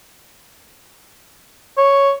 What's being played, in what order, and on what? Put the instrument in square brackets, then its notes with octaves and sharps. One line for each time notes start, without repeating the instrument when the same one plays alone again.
[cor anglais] C#5